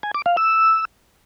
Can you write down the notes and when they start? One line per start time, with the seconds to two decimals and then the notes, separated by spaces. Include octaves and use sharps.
0.03 G#5
0.15 D6
0.26 F5
0.37 E6